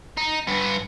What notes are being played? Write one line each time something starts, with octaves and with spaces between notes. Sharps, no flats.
D#4
G2 B3